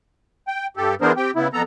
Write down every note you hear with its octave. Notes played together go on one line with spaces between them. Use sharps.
G5
G2 G4 A4
E3 B3 D4 G#4 A#4 C5
C4 G4 G5
C#3 B3 E4
F2 B3 A4 A#5